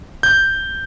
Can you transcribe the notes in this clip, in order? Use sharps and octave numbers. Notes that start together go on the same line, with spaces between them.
G6